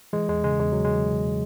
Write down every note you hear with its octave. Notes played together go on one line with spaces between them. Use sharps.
E3 G#3
E2 G#3
C#3 G#3
E2 G#3
C#3 F#3
G#3
E3